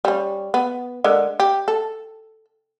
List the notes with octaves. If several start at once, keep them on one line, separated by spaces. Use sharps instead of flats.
G3 C#4
B3
D3 G#3 A#4
G4
A4